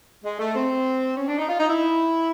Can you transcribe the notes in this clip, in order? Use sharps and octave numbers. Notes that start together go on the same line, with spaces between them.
G#3
A3
C4
C#4
D4
D#4
F4
D#4
E4